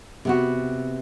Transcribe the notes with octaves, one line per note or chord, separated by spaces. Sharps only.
C3 B3 F#4